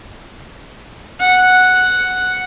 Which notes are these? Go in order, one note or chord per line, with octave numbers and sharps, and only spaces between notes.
F#5